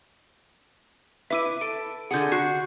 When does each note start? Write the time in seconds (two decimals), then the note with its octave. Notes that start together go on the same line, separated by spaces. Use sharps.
1.30 E4 B4 E5 D6 D#7
1.61 A4 D7
2.11 D3 F4 G#4 F#5 G6
2.32 F#4 G6 C7